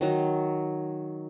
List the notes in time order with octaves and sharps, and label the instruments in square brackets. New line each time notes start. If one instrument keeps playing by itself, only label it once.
[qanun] D#3 F#3